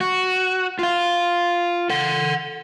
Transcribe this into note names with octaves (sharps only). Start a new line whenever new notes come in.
F#4
F4 F5
A4 F#5